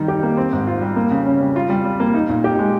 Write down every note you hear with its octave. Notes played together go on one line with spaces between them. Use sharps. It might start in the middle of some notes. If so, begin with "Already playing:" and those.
Already playing: D#3 G3 D#4
G4
A#3
C4
G#2
F4
G3
A#3
C#3
C#4
G3
F4
G3
G3
A#3
D#4
A#2
G4
G#3